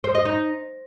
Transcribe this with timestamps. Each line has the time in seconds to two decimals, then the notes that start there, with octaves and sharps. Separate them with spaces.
0.04 C5
0.15 D#5
0.25 D#4